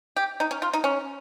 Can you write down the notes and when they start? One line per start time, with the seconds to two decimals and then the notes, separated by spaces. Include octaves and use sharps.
0.16 G4
0.40 D#4
0.51 C#4
0.62 F4
0.73 D#4
0.84 C#4